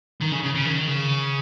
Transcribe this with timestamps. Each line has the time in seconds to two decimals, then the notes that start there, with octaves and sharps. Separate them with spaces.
0.21 D#3
0.32 C#3
0.44 C#3
0.55 C#3
0.65 D#3
0.88 C#3